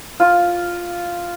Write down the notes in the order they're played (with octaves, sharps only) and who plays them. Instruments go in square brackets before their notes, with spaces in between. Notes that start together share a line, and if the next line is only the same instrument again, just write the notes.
[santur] F4